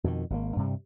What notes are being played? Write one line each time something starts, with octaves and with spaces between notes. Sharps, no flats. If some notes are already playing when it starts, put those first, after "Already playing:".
F2 B2 D3 D#3
G#1 C3 A#3
G2 C3 G3